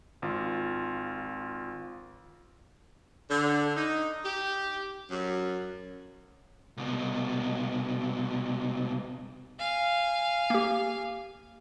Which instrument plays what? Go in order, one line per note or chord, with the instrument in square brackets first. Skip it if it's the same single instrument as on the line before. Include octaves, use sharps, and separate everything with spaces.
[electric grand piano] G#1 F4
[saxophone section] D3
D#4
G4
F#2
[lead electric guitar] C2 B2
[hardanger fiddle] F5 G#5
[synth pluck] A#3 G4